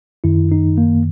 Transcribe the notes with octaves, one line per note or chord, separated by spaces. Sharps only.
F#2 D#3 E4
D#4
A#3